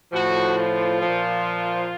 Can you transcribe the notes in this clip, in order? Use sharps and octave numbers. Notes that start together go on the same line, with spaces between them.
A2 F3 F#4
F4
A#2 F3